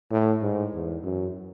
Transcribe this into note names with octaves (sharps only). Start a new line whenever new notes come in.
A2
G#2
E2
F#2